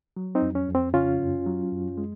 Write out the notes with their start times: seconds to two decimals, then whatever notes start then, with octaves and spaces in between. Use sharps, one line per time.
0.17 F#3
0.35 C4 D#4
0.42 F2
0.55 C#4
0.68 F2
0.75 C4
0.93 C#3 C#4 F4
1.20 F#2
1.47 F#3
1.72 F#2
1.97 G#3